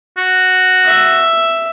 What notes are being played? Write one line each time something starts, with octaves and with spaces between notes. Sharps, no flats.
F#4
E5